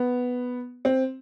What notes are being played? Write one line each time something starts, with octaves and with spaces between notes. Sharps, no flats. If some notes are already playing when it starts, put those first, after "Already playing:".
Already playing: B3
C4